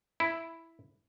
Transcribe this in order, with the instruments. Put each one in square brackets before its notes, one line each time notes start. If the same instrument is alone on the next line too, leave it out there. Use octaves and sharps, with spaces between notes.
[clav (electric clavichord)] E4